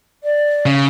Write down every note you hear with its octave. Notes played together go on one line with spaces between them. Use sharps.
D5
C#3